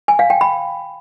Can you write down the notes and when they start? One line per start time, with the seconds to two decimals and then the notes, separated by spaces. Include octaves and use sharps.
0.08 G#5
0.19 F5
0.30 G5
0.41 B5